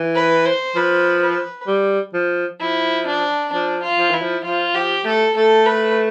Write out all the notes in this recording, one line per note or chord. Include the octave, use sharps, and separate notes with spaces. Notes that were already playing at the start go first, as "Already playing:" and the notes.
Already playing: E3
B4
C5
F3 B4
B4
G3
F3
F3 E4
D4
F3 D4
F4
F3
E3 E4
F3
F3 F4
F3 G4
A3 A4
A3 A4
B4